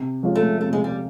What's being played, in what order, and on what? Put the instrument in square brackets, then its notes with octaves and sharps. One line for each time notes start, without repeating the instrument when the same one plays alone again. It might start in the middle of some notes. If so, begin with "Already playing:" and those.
Already playing: [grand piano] C3
F3 G#3 C#4 F4
[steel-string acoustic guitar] A3
[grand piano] C3 [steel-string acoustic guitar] A3
[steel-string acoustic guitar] G#3
G3